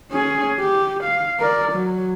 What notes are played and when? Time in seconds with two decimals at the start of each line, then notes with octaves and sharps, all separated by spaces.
0.11 C#4 G#4
0.60 G4
1.04 F5
1.40 A#4 D5
1.72 F#3